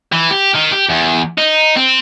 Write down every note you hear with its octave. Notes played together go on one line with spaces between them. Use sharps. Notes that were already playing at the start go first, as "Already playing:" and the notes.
E3
G4
D#3
G4
E2
D#4
C4